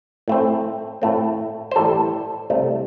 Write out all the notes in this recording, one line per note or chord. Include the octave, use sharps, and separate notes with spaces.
A2 A3 C4
A2 A3 C4
C5
A2 E3 G3 A4
C2 C3 A3